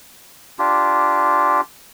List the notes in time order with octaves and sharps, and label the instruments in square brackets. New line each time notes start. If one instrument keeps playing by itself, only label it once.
[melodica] D4 F4 G4